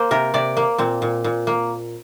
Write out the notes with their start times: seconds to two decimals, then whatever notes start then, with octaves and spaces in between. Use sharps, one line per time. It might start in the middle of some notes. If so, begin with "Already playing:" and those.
Already playing: A#3 C5
0.11 C3 A#4
0.34 C3 D5
0.57 A#3
0.78 A#2 C4
1.02 A#2
1.24 A#2
1.47 A#3